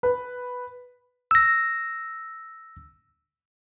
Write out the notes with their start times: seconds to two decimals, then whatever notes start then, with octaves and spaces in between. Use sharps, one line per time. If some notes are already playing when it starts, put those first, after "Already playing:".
0.03 B4
1.31 E6 A#6